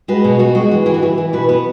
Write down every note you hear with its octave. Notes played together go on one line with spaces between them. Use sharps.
G#3 F#4 B4
B2
B3 F#4
G#3 F#4
E3
E3 G#4
F#4
E3 E4
E3
B2 F#4 B4
B3 F#4 B4